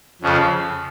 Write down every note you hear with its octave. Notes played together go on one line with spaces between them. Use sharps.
F2 C#3 F3